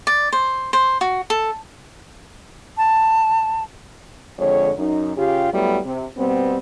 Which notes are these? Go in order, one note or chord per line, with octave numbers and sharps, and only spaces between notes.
D5
C5
C5
F#4
A4
A5
F2 D3 G#3 C#5
F#2 D#4
C#3 F4 G4
F#3 G3 A3 B3 E4
C3
B2 G3 B3 C4